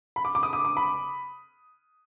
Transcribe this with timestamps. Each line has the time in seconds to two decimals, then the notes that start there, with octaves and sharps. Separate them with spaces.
0.16 B5
0.25 D6
0.35 D6
0.43 D#6
0.53 D#6
0.65 D6
0.77 B5